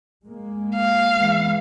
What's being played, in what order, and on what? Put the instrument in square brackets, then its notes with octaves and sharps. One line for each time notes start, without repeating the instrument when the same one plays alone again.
[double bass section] G#3 A#3
[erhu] F5
[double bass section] E3 G#3 B3